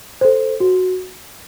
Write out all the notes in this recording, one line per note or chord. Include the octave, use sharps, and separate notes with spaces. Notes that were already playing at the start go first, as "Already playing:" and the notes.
A4 C5
F#4